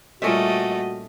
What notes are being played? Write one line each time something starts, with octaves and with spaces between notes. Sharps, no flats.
A#2 G3 A3 C#4 F#4 D#5 E5